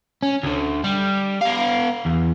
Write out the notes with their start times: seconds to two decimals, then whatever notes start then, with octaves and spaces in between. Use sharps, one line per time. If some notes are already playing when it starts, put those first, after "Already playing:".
0.23 C#4
0.43 D2 D3
0.84 G3
1.42 B3 F5
2.06 E2